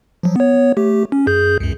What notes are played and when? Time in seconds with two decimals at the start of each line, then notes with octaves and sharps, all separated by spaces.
0.23 F3 F#3
0.36 B3 C#5
0.77 A3 G4
1.12 C#4
1.27 F#2 G#4 G6
1.60 C#2 F#2